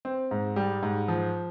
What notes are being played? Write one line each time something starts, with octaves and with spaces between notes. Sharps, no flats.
C4
G#2
G3
G#2
F3